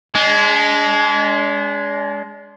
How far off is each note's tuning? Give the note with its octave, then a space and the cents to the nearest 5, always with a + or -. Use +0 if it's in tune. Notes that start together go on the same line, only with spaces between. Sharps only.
G#3 +0 D4 -40